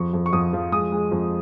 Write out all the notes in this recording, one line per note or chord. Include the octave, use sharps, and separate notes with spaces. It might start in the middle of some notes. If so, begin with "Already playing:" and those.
Already playing: F2 C#6
F2
C#6
F2 D#6
F3
G#3 D#6
G#3
F2